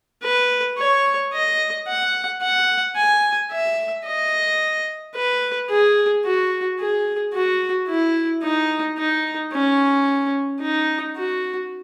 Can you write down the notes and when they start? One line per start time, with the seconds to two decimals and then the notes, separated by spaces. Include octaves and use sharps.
0.24 B4
0.78 C#5
1.33 D#5
1.88 F#5
2.42 F#5
2.97 G#5
3.51 E5
4.06 D#5
5.15 B4
5.70 G#4
6.25 F#4
6.80 G#4
7.34 F#4
7.88 E4
8.43 D#4
8.98 D#4
9.53 C#4
10.61 D#4
11.17 F#4